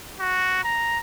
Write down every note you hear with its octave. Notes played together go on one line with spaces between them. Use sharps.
F#4
A#5